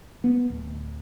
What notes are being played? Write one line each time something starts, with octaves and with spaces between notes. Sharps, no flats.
B3
D1